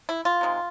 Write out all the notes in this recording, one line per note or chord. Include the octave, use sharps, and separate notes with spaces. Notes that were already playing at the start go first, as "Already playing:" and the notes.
E4
F4
C3 D#3 G#3